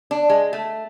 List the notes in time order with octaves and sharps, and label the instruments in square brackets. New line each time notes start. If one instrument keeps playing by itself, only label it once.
[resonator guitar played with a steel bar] D4
G#3
A3